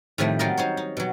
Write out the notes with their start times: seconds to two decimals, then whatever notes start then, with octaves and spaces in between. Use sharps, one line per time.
0.18 A2 C3 D#3 F3 G3 A3
0.39 F#3 G3 F4 A#4 D#5
0.57 D#4 C5 C#5
0.77 D#4
0.97 B2 F#3